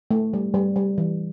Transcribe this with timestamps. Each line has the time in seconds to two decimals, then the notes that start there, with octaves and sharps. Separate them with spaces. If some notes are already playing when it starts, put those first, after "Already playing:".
0.11 A3
0.33 G3
0.54 G3
0.76 G3
0.98 E3